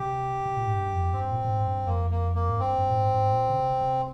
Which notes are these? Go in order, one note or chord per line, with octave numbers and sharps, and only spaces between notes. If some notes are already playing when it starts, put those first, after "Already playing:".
Already playing: C3 G4
C3
A#2
G#2
G2
F2
G2 C4
A#2
A#2
G#2
G2
F2 A#3
A#3
A#3
G#2
G2 C4
G2
A#2
G#2
G#2
A#2
C#3
C3
C3